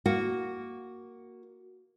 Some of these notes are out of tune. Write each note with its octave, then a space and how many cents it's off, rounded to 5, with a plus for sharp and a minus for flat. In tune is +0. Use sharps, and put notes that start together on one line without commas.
A#3 +0 F#4 +0